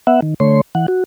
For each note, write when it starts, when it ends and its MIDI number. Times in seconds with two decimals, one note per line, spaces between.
0.07 0.21 59
0.07 0.21 76
0.07 0.21 78
0.22 0.34 51
0.40 0.61 50
0.40 0.61 57
0.40 0.61 73
0.40 0.61 84
0.75 0.86 52
0.75 0.86 78
0.88 1.04 66